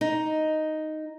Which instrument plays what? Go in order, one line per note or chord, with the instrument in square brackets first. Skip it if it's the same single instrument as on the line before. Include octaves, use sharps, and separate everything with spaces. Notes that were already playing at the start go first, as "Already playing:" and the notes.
[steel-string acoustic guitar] D#4